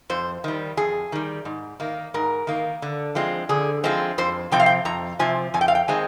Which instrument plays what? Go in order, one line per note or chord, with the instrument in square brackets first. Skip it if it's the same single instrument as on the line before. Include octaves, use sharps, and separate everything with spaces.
[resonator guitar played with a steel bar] F2 C5
D#3 G3
F2 G#4
D#3 G3
G#2
D#3 A#3
G#2 A#4
D#3 A#3
D3
F3 G#3 C4
D3 G#4
F3 G#3 C4
F2 C5
C3 F3 C4 G5
F5
G5
F2 A#5
C3 F3 C4 G#5
F2 G#5
G5
F5
G5
D#3 G#3 C4 G#5